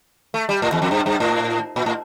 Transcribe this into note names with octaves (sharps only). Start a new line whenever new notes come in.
A3
G3
A2
E2
F2
G2
G2
A2
A#2
A2